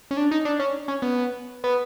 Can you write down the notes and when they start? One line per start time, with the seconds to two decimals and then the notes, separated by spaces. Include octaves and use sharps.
0.11 C#4
0.17 D4
0.31 D#4
0.45 D4
0.59 C#4
0.88 C#4
1.02 B3
1.64 B3